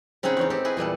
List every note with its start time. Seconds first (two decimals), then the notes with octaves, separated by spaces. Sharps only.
0.23 C#3 C4 D#4 G#4 F#5 B5
0.37 E2 C#4 D#4
0.50 C4 G4 A4
0.65 E4 G#4 B4
0.77 E2 A#2 G3 A4